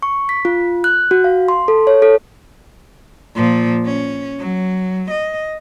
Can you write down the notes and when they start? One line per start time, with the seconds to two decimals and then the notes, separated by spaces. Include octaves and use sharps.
0.02 C#6
0.29 B6
0.45 F4
0.84 F#6
1.11 F#4
1.24 F5
1.48 C6
1.68 A4
1.87 C#5
2.02 A4
3.35 A#2 F3
3.86 C#4
4.39 F#3
5.11 D#5